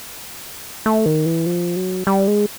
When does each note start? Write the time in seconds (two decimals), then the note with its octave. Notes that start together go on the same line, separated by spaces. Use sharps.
0.86 A3
1.06 D#3
1.26 E3
1.46 F3
1.76 F#3
2.07 G3
2.28 G#3